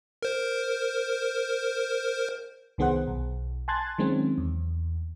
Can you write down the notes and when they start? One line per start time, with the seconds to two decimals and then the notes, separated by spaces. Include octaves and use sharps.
0.22 A#4 C5
2.78 C2 D#3 B3 G#4 C5 F#5
3.07 B1
3.68 G#5 A5 C6 F#6 G#6 A6
3.98 D#3 F#3 G#3 C4 C#4
4.38 E2